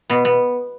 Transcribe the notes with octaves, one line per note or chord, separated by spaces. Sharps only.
B2 B3
B3